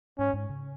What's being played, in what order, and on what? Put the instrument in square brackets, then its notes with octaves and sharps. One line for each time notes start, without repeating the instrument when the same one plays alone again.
[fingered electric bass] G#2 [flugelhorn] C#4
[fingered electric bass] G#2
C#3